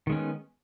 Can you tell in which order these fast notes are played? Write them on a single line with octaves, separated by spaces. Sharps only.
D#3 G#3 C#4 B3